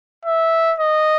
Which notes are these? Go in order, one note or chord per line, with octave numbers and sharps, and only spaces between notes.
E5
D#5